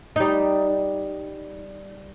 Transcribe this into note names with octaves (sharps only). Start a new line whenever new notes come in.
G3 D#4